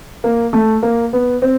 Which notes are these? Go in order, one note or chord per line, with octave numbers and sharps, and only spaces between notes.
A#3
A3
A#3
B3
C4